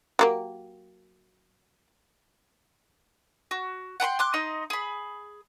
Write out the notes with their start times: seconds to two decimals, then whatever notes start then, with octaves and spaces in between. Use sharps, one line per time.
0.19 F#3 A#3 G4
3.51 F#4
4.00 F#5 G5 A#5 C6
4.19 C6 D6 F#6
4.34 D#4 D#5 C6
4.70 G#4 B5